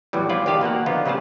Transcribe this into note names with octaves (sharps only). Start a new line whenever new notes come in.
E2 A2 E3 F#3 G3
F3 E4 F4 D5
E2 D#3 G4 F5 A5
B2 A#3 F#4 F#5
D3 D#3 F3 B3 D#4 F4
C#3 G3 A3 G#4 A5